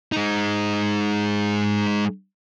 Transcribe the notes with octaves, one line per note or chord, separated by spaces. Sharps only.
G#3 D#4